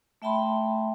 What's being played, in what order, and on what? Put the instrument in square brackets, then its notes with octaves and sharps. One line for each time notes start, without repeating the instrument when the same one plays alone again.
[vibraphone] A3 E5 G5 A5 B5 C6